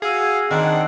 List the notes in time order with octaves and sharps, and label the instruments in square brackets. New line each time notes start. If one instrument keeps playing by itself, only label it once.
[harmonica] F#4 F5 [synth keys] G#4 [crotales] E6 C7
[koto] D#3 [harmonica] C4 D4 F#5